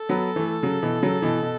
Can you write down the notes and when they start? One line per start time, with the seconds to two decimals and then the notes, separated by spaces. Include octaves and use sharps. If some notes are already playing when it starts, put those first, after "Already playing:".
Already playing: A4
0.09 F#3 B3
0.36 E3 A3
0.63 C#3 F#3
0.82 B2 E3
1.02 C#3 F#3
1.22 B2 E3
1.43 B2